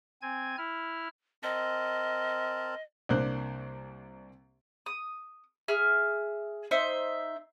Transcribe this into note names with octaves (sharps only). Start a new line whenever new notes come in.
C4 G#5 G#6
E4 F6
C4 A#4 D#5 A5
C2 A#3 D4 C5 F#6
D#6
G#4 E5 F6
D#4 C5 E5